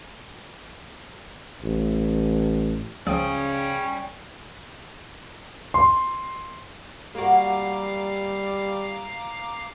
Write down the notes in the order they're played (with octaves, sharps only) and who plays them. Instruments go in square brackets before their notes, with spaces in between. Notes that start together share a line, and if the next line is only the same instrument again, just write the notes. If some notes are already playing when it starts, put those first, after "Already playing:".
[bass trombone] A1
[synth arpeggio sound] C#2 F3 D#6 [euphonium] C#3 [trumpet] C#4 [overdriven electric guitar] D5 G5
[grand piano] C6
[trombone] G3 [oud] A#3 F#4 [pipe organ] F5 A#5 D6